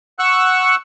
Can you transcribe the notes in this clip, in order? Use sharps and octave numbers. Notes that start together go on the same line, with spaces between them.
F#5 C#6 E6 F#6